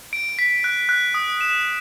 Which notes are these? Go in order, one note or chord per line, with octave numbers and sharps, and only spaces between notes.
D7
B6
F#6
F#6
D#6
E7